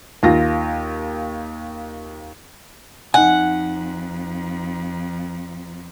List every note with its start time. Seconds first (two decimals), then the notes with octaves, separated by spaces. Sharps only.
0.23 D#2 F4 A#6
3.14 F2 D#4 F#5 G#5